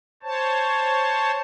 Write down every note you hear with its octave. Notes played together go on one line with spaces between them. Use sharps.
C5 C#5 A5